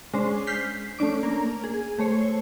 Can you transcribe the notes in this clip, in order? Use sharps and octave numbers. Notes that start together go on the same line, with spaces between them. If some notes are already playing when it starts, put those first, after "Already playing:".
G#3 C#4 D4 C5
F6 G6 B6 C7
A3 C#4 D4 D6
A#3 A#4
G#4
A3 C5 C#5